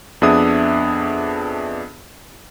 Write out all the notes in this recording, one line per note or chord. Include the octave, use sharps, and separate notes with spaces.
F2 B3 D4 G#4 E5 D#6